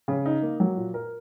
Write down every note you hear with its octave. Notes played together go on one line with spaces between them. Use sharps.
C#3
D#4
A#3
F#3
A#2
A#4